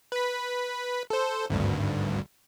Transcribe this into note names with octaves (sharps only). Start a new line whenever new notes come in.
B4 B6
A4 C5
G#1 D2 G2